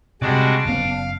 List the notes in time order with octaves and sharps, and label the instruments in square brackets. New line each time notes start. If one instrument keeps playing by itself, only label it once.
[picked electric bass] C3 [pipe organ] G3 G#3 F#4 [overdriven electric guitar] D5 A5
[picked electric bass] F#1 F#2 B3 [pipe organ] F5